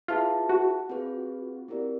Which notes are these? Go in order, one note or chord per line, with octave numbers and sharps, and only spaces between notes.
E4 F4 G#4 B4 E5 A5
F#4
C4 F4 G#4 B4
C4 E4 G4 A#4 D5